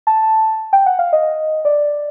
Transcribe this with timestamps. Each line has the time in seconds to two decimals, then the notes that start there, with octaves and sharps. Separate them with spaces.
0.07 A5
0.73 G5
0.86 F#5
0.99 F5
1.13 D#5
1.65 D5